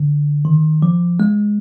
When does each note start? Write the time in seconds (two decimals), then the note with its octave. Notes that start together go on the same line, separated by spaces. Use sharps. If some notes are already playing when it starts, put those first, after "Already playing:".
Already playing: D3
0.45 D#3
0.82 F3
1.20 G#3